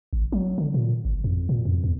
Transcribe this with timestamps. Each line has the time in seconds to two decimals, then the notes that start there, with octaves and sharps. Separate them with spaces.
0.13 G#1
0.32 F#3
0.58 D3
0.74 A#2
1.05 G1
1.24 F2
1.49 A#2
1.65 F2
1.84 E2